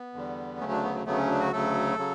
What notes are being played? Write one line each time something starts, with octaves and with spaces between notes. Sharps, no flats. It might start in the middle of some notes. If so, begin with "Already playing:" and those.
Already playing: B3
E2 D3 G3
D2 C#3 F#3 A3 C#4
D4
B3
A3
D2 C#3 F#3 A3 B3
C#4
D4
F#4
D2 C#3 F#3 A3 A4
C#3 F#3